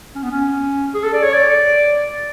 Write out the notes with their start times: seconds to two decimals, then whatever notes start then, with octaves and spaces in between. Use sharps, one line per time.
0.15 C#4
0.23 B3
0.31 C#4
0.94 G#4
1.04 A4
1.14 D5
1.23 C#5
1.34 D5